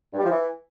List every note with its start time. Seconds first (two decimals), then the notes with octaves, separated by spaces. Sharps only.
0.12 G2
0.18 G3
0.24 F3
0.29 E3